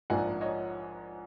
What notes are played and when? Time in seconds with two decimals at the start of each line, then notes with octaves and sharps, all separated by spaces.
0.10 A#1 G#2 F3 A#3 D4 F#5 G#5
0.41 C#5 D#5